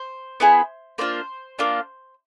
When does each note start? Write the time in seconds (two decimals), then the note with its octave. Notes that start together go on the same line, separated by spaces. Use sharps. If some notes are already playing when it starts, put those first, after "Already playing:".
Already playing: C5
0.40 B3 E4 G#4
0.98 A#3 D4 F4 C5
1.59 A#3 D4 F4